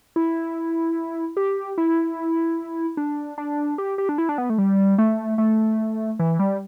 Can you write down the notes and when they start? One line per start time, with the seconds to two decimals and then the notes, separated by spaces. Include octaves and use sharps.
0.16 E4
1.37 G4
1.78 E4
2.97 D4
3.38 D4
3.78 G4
3.98 G4
4.09 D4
4.18 E4
4.29 D4
4.38 B3
4.50 A3
4.58 G3
4.98 A3
5.38 A3
6.19 E3
6.39 G3